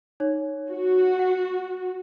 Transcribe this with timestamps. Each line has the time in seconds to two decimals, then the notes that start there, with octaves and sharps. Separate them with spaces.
0.20 D#4 C#5
0.70 F#4
1.19 F#5